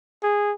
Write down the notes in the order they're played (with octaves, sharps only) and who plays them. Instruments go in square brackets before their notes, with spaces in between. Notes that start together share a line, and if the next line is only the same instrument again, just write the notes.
[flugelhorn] G#4